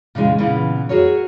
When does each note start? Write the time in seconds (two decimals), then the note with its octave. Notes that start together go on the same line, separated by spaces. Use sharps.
0.15 A#2 C#3 E3 G#3
0.38 A#2 C#3 E3 B3
0.89 F#4 G#4 A#4 C#5